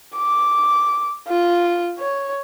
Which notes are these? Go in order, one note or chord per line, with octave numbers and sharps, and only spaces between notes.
D6
F4
C#5